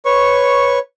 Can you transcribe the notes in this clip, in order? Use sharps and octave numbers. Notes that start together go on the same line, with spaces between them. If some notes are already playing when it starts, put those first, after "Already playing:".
B4 C#5 C#6